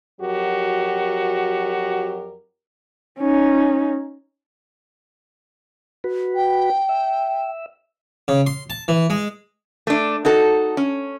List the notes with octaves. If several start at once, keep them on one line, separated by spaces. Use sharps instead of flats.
F2 F#3 F#4 G4 A#4
C#4 D#4
F#4 B4
G5
E5
C#3
C6
A5
E3
G#3
A3 D4
D#4 F#4 A4
C#4